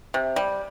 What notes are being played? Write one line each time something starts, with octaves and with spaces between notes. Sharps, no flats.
C3
G3